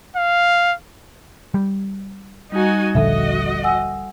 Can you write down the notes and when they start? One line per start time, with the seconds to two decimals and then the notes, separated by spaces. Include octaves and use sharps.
0.16 F5
1.54 G3
2.52 G3 D#4 F#4 G#5
2.95 D#1 A#1 D3 F#4 A4 D#5 E5
3.64 F#5 G#5 E6